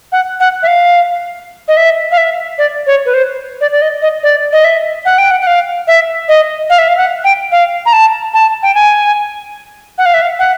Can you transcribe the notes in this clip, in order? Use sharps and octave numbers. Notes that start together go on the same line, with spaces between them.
F#5
F#5
E5
F5
D#5
E5
F5
E5
D5
C#5
B4
C5
D5
D5
D#5
D#5
D5
D#5
E5
F#5
G5
F#5
F#5
F5
E5
D#5
F5
E5
F5
F#5
G5
F5
A#5
A5
A5
G5
G#5
F#5
F5
E5
F5
F#5